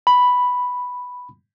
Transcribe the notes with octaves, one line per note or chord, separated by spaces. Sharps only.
B5